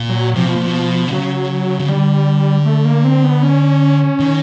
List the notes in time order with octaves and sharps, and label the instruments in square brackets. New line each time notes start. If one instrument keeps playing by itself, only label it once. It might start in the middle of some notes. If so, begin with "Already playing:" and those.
Already playing: [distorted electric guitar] A#2
[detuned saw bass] F#3
[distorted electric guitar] C3 [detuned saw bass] F3
[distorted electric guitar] B2
A#2
B2
D3
[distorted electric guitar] C#3 [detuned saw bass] F#3
[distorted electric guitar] C#3
[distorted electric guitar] D3 [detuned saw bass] G3
[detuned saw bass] A3
A#3
C4
B3
C#4
[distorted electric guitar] D#3